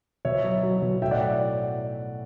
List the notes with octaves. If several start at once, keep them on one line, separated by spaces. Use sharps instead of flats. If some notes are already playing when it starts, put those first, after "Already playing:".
B2 C#5 E5
F#3
F#3
B2
A2 E5 G5
D5 F#5